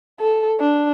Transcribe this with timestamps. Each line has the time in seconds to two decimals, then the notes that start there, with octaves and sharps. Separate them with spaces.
0.20 A4
0.60 D4